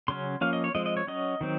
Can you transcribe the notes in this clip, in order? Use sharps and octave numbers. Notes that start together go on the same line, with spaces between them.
C#3 F#3 C#4 C6
F3 A#3 C#4 F5
D#5
C#5
F3 G#3 C4 D#5
D#5
C#5
F#3 C#4 D#5
D#3 F#3 C4